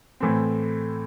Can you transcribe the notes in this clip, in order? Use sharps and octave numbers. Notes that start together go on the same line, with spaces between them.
A2 E3 A3 C4